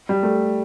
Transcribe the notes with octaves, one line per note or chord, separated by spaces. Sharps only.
G3
A3